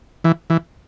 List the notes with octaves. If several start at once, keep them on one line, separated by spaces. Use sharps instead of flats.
E3
E3